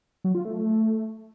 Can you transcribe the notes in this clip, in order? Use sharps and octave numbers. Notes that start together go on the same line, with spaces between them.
F#3
F4
A3